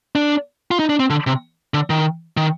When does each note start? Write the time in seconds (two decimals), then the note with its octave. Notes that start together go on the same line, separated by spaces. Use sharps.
0.15 D4
0.71 F4
0.79 D#4
0.89 D4
1.00 C4
1.10 D3
1.27 C3
1.74 D3
1.90 D#3
2.37 D#3